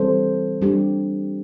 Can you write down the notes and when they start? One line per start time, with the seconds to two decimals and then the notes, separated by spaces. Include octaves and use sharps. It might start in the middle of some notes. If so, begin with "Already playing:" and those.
Already playing: E3 G3 C4 A4 C5
0.62 G3 D4 G4